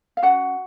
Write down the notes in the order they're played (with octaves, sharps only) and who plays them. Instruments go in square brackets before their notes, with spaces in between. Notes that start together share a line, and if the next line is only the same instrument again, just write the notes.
[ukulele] F5
C#4 F#4 F#5